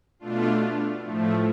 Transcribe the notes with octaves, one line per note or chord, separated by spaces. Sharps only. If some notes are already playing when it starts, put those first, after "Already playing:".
B2 A3 D4 F4
A2 F3 A3